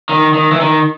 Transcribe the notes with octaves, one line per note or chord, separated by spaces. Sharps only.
D#3
D#3
E3
D#3